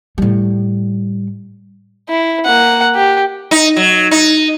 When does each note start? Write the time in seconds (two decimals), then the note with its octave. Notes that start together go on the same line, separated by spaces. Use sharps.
0.18 A2 G3
2.09 E4
2.45 A#3 F#5
2.95 G4
3.51 D#4
3.76 F#3
4.11 D#4